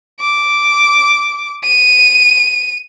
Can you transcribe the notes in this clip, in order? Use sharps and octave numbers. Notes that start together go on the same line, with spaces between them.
D6
D#7